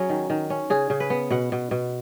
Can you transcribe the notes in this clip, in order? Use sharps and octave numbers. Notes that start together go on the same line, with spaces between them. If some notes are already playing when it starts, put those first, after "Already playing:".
Already playing: F#3 C#4 G#4
D#3
D#3
C#4
C#3 G#4
C#3
B4
B3
B2 F#5
B2
B2